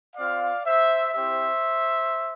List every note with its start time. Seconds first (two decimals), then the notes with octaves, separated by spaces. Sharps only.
0.16 C4 F4 D5 F5
0.66 C5 E5
1.15 C4 E4 G4 C5 E5